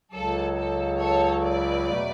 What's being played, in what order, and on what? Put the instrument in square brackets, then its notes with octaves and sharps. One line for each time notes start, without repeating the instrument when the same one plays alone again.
[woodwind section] C#2 C#3 F#3 [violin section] A4
[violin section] A4
A4 C#5
B4 D5
[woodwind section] E2 B2 F#3 A3